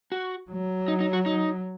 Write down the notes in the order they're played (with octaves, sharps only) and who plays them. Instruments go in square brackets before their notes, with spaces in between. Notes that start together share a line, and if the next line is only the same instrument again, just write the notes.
[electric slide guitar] F#4
[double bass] F#3
[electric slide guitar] D#4
D#4
F#4
D#4